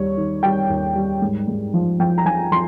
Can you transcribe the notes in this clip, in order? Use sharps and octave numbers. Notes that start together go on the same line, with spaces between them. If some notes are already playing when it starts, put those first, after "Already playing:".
Already playing: D#2 G3 C#5
D#3
G3 G5
D#2
G3
G#2
G#2
F3
F3 G5
A#5
F3 G#5
F3 C6